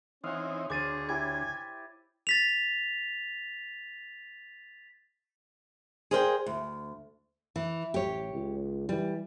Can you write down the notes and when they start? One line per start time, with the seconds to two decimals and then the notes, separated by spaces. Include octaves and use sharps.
0.24 E3 C4 C#4 D#4 F5 F#5
0.70 D2 G#4 C5 C#5 D6 A6 D#7
1.09 E4 G4 D5 G#5 G#6
2.27 A6 B6 F7
6.11 G#4 A#4 C5 D5 F#5 G5
6.46 D2
7.56 E3
7.94 A1 G4 C#5
8.31 C#2
8.89 E3 G3